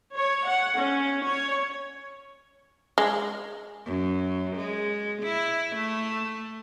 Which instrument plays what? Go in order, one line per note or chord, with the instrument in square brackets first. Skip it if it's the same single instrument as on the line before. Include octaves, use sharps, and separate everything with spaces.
[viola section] C#5
F#5
C#4
C#5
[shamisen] G#3
[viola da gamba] F#2
G#3
E4
A3